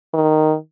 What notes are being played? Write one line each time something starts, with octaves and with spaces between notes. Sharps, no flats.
D#3